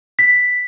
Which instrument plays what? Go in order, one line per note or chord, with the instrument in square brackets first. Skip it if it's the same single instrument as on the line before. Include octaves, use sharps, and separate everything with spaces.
[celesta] B6